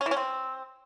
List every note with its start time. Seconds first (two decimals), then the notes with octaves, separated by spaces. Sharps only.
0.01 C#4
0.06 E3
0.11 C#4
0.16 C4